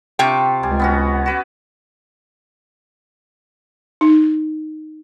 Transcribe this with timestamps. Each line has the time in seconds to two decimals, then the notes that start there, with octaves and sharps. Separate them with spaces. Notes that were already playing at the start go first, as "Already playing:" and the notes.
0.19 C3 F4 G5 C#6 D6
0.63 C#2 G3 G#5
0.79 B3 C#4 F#4
1.26 F#4 B4 D5
4.01 D#4